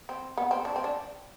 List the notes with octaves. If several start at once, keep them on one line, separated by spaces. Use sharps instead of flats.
C4
B3
C4
D4
C4
D4